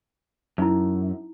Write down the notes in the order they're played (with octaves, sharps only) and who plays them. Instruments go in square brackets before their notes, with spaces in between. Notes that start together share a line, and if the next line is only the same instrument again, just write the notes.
[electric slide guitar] F#2 [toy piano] D#4 E4